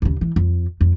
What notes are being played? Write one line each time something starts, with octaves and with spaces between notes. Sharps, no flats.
D#2 C#3
E3
F2
F2